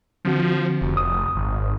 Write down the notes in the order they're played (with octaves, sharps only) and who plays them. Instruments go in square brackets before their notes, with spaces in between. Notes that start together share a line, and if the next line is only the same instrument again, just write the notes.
[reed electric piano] D3 C4 F#4 [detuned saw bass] F3
[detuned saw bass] F1
[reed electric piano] D#6
[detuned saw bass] G#1